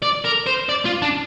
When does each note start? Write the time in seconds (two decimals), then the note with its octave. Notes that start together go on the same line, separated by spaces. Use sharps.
0.03 D5
0.25 A#4
0.47 C5
0.69 D5
0.85 F4
1.02 D4